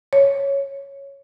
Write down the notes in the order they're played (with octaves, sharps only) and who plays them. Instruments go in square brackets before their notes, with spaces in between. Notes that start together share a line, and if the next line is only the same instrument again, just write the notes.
[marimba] C#5